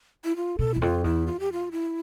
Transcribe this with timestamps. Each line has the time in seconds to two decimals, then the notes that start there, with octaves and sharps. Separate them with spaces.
0.25 E4
0.36 F4
0.59 B2 A4
0.74 E2 E4
0.81 F2 F4
1.04 E2 E4
1.27 F4
1.40 G4
1.52 F4
1.72 E4